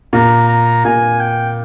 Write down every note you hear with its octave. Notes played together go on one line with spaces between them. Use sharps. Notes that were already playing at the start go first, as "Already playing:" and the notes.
A#2 A#5
A#5
A#2 G#5
G5